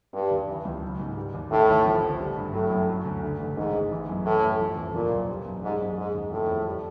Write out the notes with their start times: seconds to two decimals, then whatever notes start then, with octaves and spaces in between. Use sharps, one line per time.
0.13 G2 G3
0.31 D#2
0.48 E3
0.65 C#2
0.83 F#3
0.99 G#2
1.17 G3
1.34 D#2
1.51 A2 D#3
1.68 A1
1.85 F3
2.02 D2
2.20 G3
2.37 G2
2.53 A2 F#3
2.71 F#2
2.89 F#3
3.05 D2
3.23 D3
3.40 A1
3.57 G#2 D#3
3.74 A1
3.91 E3
4.09 F#2
4.25 A2 E3
4.43 A1
4.60 F3
4.77 E2
4.94 A#2 F3
5.11 B1
5.29 G3
5.46 F#2
5.63 G#2 G3
5.80 F#2
5.98 G#2 G#3
6.14 D#2
6.32 A2 F3
6.48 F2
6.66 G3